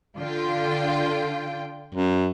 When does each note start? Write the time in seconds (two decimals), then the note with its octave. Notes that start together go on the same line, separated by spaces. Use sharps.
0.18 D3 F4 G5
1.95 F#2